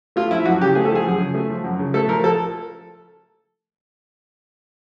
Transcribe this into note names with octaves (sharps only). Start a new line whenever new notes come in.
A3 F4
F3 E4
F#2 F#4
C#3 G4
A3 G#4
A4
F3 G#4
F#2
C#3
A3
F3
F#2
C#3
A3 A4
F3 A#4
A4